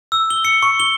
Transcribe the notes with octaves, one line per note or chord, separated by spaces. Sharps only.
E6
G7
C#7
C#6
G7